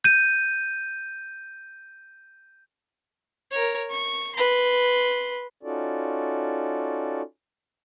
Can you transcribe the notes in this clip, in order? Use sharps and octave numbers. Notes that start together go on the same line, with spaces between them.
G6 D#7
A#4 C#5
C#6
B4 C6
C#4 D#4 F4 F#4 A4 D5